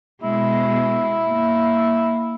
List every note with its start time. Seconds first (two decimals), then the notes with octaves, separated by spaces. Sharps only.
0.23 B2 G#3 E4
1.25 A#3